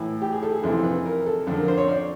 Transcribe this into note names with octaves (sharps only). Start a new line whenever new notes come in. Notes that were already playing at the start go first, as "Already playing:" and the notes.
Already playing: A2 E3
G4
G#4
A4
G#4
F2 C3 E3 A4
B4
A#4
A4
F2 D3 A4
A#4
C5
C#5
D5